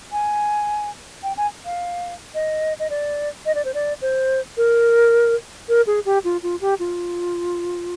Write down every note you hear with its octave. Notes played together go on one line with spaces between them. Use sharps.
G#5
G5
G#5
F5
D#5
D#5
D5
D#5
D5
C5
D5
C5
A#4
A#4
G#4
G4
F4
F4
G4
F4